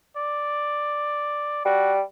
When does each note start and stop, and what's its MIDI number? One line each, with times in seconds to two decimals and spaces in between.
0.17 1.61 74
1.65 2.02 55
1.65 1.93 66